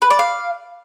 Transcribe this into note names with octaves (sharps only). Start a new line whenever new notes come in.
B4
D5
F5